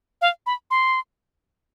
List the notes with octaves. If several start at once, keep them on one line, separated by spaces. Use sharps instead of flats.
F5
B5
C6